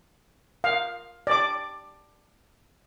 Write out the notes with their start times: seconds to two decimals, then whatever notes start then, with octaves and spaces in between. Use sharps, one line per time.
0.64 F5
1.27 D5 D6